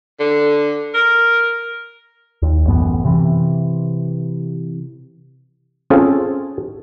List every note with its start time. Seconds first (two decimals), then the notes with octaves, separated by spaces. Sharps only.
0.20 D3
0.94 A#4
2.42 D#2
2.66 A1 F#2 B3
3.05 C3 E3
5.90 C4 C#4 F4 G#4 A4